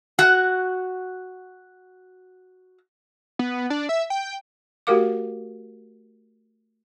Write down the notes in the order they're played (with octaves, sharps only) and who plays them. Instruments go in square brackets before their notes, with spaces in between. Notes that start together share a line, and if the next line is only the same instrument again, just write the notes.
[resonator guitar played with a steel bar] F#4 F#5
[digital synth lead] B3
D4
E5
G5
[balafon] A3 F#4 G4 A#4 F5 D6